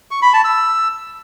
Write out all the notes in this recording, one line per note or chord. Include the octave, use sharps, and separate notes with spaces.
C#6
B5
A5
E6